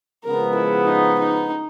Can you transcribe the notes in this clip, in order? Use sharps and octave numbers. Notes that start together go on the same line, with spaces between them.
C#3 F3 G#3 B3 A#4
E4
D#4
D#4